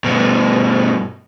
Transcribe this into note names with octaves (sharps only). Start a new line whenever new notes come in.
G2 B2